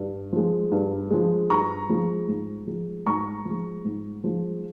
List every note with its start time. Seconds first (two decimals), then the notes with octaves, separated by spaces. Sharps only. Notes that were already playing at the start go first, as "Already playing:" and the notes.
Already playing: G2
0.32 F3 G#3
0.71 G2
1.11 F3 G#3
1.50 G2 A#5 C#6
1.89 F3 G#3
2.28 G#2
2.67 F3 G#3
3.06 G#2 A#5 C#6
3.45 F3 G#3
3.84 G#2
4.24 F3 G#3